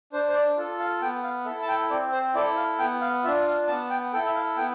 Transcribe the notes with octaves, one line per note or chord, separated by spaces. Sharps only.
D4 C5
C5
D5
F4 A4
F5
B3 G5
F5
E4 A4 E5
A5
G5
C4 D5
C5
E4 A4 D5
F5
B3 G5
F5
D4 F4 E5
F5
B3 A5
G5
E4 A4 G5
E5
F5
B3 G5